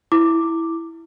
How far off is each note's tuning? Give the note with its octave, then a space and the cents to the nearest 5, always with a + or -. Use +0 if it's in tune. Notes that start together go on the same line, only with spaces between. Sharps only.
E4 +0 D6 +0